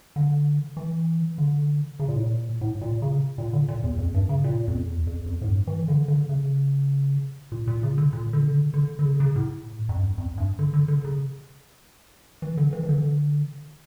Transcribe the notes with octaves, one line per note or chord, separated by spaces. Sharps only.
D3
E3
D3
C#3
A#2
A2
A#2
A2
A#2
C#3
A#2
D3
A#2
E2
F2
G2
C#3
A#2
F2
E2
F2
F2
A2
G2
E3
D3
D3
C#3
A#2
A#2
C#3
D3
A#2
D3
C#3
D3
D3
D3
C#3
C#3
A2
F2
G2
F2
G2
D3
D3
D3
C#3
E3
D3
E3
E3
D3